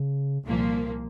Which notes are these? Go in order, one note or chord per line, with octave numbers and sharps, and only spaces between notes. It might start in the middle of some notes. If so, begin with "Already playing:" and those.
Already playing: C#3
C2 A#2 F3 A#3